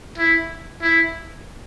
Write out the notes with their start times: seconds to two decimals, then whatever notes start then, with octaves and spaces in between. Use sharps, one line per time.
0.18 E4
0.82 E4